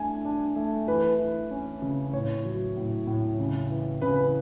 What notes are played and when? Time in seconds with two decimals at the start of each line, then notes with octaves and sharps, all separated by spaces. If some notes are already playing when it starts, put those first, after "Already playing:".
Already playing: A3 D4 G#5
0.25 D4
0.56 A3
0.88 E3 B4
1.19 E3
1.51 C#4
1.82 C#3
2.13 A2 C#5
2.45 F#3
2.77 A2
3.07 A2
3.40 C#3
3.70 E3
4.02 C#3 B4